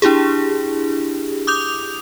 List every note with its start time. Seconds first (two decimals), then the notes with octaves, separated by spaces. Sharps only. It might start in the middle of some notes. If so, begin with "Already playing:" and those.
0.02 D4 E4 G4 G#4
1.47 D6 D#6 G6 F7